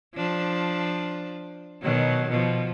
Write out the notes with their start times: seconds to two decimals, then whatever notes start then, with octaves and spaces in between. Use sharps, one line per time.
0.14 F3 D4
1.82 B2 D#3 F#3
2.30 B2 F3